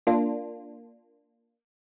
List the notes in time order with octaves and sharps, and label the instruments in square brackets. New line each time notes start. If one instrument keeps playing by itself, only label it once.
[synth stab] A#3 D4 F4